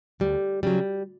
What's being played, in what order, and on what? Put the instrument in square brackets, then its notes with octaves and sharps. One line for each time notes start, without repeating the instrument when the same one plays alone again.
[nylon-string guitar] D2 G3
C#3 F#3 G3